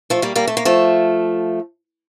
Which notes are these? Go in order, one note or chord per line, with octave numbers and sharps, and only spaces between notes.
F3 A3
G3 A#3
G3 A#3
A3
A#3
F3 A3